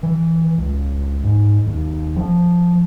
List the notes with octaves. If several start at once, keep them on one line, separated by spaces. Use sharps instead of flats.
E3
C#2
G#2
D#2
F3